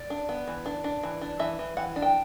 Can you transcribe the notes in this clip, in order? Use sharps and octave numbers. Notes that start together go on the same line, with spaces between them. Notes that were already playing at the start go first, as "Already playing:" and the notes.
Already playing: D5
D4
B3
E3
D4
D4
E3
D4
E3 E5
E3
E3 F#5
D4
G5